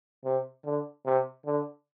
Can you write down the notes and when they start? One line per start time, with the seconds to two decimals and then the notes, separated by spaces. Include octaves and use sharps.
0.25 C3
0.65 D3
1.06 C3
1.46 D3